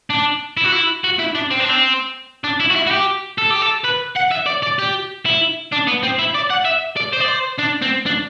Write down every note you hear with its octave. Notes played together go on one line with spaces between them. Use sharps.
D4
E4
F#4
E4
F#4
E4
D4
C4
D4
C4
D4
E4
F#4
E4
F#4
G4
A4
G4
A4
B4
F#5
E5
D5
D5
G4
E4
D4
B3
C4
E4
D5
F#5
E5
D5
C5
D5
C5
D4
C4
D4